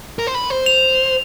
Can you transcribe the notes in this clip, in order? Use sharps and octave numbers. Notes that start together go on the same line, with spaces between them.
A#4
C5
B4
C5
F7